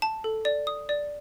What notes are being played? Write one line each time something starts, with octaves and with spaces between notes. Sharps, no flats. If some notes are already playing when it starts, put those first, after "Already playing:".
A5
A4
D5
D#6
D5